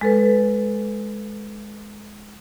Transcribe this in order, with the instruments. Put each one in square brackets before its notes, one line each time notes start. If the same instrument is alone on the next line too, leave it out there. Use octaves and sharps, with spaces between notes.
[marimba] G#3 A4 B4